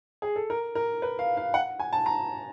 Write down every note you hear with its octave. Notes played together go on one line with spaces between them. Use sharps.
G#4
A4
A#4
A#4
B4
F5
F5
F#5
G#5
A5
A#5